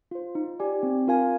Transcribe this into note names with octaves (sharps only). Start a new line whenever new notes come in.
F4 C5
D#4
G4 D5 G#5
C4
F4 A#4 F5 G#5